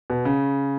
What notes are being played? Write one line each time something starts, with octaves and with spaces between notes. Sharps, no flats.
B2
C#3